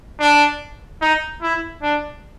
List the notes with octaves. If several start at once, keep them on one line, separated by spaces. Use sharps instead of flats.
D4
D#4
E4
D4